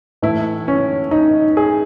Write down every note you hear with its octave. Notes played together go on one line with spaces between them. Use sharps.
A2 E3 A3 E4
C#4
D#4
G#4